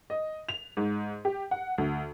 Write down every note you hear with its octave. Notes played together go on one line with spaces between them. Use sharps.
D#5
F7
G#2
G4
F#5
D2